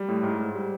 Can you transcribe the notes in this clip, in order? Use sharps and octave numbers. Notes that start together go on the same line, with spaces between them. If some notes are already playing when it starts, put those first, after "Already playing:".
Already playing: G3
A2
G#2
G#2
G3